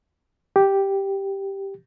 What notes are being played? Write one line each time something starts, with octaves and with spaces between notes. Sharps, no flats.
G4